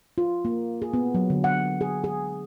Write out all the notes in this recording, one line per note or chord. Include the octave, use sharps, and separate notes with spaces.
F4
A#3
G#4
B3
F#3
D3
F#5
G#4
G#4